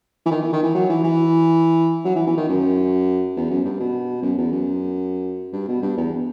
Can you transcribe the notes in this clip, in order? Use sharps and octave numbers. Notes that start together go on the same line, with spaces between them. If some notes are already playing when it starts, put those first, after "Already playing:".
E3
D#3
E3
D#3
E3
F#3
E3
E3
F#3
E3
E3
D#3
F#2
E2
F#2
G2
B2
F#2
E2
F#2
G2
B2
G2
E2